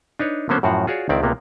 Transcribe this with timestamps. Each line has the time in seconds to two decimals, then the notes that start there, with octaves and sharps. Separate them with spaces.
0.19 D4 D#4 B4 C#5
0.49 D3 F#3 A#3 B3 C#4 C5
0.63 F#2 A2 F3 F#4 F5 F#5
0.87 F4 F#4 G#4 C#5 D5
1.09 C#2 D#3 C4 E4 D5
1.22 C#2 C3 A#3 B3